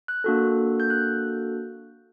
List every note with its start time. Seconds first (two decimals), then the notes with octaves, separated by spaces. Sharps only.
0.08 F#6
0.24 A#3 D4 F#4 A4
0.80 G6
0.90 F#6